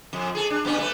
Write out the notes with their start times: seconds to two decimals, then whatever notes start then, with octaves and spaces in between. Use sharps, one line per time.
0.13 F2
0.35 G#4 A4
0.50 D4
0.65 G2 B3 C#4
0.78 A3 B4